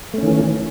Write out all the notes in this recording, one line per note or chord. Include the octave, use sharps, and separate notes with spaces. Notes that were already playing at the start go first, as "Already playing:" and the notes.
D#3 E3 A3 C#4